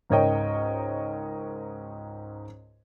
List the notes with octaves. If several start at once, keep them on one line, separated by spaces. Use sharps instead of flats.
C#2 G#2 A#4 C#5 D#5 G5